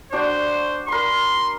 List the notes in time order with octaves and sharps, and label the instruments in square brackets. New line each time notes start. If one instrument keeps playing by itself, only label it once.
[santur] D4 F#4 G5 [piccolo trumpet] C5
[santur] A#4 B5 [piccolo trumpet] C6